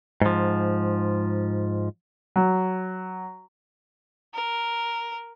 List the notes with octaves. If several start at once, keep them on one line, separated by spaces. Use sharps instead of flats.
G#2 F3
F#3
A#4